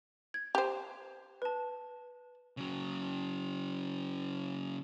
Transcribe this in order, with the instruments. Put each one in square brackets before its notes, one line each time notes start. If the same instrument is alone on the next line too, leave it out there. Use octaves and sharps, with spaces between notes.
[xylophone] G#6
[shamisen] G4 C5
[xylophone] B4 A5
[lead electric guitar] C#3 F#3